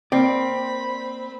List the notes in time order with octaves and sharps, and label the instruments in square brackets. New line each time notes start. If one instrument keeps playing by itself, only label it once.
[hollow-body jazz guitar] A#3 D5 [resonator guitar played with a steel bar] C4 [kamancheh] B5